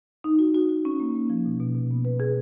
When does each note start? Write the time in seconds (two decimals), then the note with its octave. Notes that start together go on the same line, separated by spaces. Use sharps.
0.24 D#4
0.39 F#4
0.55 F#4
0.69 F#4
0.85 C#4
1.00 A#3
1.15 A#3
1.30 F3
1.45 B2
1.60 B2
1.75 B2
1.91 B3
2.05 B4
2.20 G#4